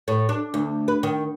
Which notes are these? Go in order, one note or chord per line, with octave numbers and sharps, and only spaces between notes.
A2
D4
D2
B4
D#3